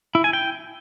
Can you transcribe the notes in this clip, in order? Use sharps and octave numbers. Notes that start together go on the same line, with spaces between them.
E4
G#5
G5